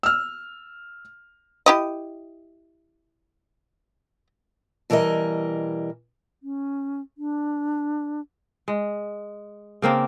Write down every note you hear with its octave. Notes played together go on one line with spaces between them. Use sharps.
E6 F6
E4 G4 D#5
B2 E3 G3 A#4 D#5
C#4
D4
G#3
C#3 A#3 C4 D4